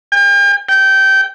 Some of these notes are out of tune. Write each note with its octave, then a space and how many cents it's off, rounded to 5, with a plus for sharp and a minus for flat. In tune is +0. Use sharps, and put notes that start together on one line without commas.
G5 +40
G5 -20